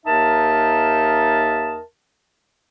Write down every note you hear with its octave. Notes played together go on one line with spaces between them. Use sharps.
D#2 D#4 A#4 E5 A5